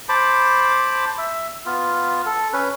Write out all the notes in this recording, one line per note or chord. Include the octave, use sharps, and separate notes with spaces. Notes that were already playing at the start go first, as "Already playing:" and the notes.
C5 A5 B5 D6
E5
B3 F4
A4
C#4 B4